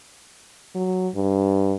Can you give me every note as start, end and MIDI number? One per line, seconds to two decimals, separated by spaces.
0.75 1.09 54
1.15 1.76 43